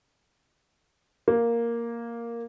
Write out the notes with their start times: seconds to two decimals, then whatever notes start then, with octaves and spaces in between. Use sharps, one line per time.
1.28 A#3